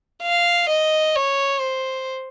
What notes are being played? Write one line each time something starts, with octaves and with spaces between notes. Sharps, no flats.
F5
D#5
C#5
C5